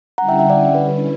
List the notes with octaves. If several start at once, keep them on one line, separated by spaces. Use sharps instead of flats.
D3 G3 C#4 E4 F#5 A#5
E5 G5
E5 G5
D5 F#5
B4
B4